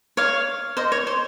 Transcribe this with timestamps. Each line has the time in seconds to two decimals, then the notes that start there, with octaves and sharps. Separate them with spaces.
0.17 C#5 F5
0.77 C5 D#5
0.92 C#5
1.07 C5